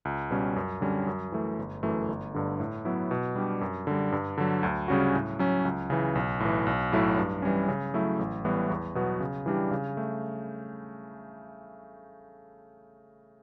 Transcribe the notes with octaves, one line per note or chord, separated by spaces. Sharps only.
C#2
B2 G3 C#4
F#2
D3 G3 C#4
F#2
E3 A3
G1
F#2 E3 A3
G1
G2 D3
A2
F#3 B3 E4
B2
G3 D4 G4
F#2
D3 G3
G2
D3 F#3
D2
C#3 G3 C#4 F#4
A2
F#3 C#4
C#2
C#3 E3
B1
A2 E3
B1
A2 F#3 A3 E4
G2
E3 G3 C#4
C#3
F#3 A3 E4
A1
A2 E3 G3 B3
E2
B2 F#3 B3 F#4
C#3
E3 G3 D4 G4
C#3
A3